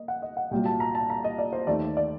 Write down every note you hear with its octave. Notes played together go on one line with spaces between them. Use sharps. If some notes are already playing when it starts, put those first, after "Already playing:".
Already playing: A#3 D#5
F#5
D#5
F#5
C2 A#2 F#3 G5
A5
A#5
A5
A#5
D#5
D5
C5
D#2 D#3 A3 D5
D5